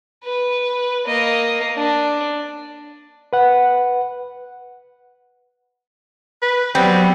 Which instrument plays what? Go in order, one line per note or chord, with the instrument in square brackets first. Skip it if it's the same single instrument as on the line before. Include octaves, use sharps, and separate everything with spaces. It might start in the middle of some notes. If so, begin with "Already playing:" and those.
[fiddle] B4
A#3 D#5
D4
[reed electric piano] B4 F#5
[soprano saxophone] B4
[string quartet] F#3 G3 [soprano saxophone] B3 [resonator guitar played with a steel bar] C4